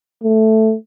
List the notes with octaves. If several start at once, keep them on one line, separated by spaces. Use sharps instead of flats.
A3